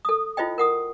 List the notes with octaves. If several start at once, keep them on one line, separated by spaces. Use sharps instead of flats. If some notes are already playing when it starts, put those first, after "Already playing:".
A4 D#6
E4 F4 C5 D#5 G5
A#4 F#5 D#6